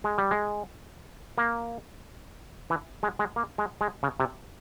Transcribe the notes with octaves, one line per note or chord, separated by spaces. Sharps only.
G#3
G3
G#3
A#3
E3
G#3
G#3
A#3
G#3
G#3
C#3
C3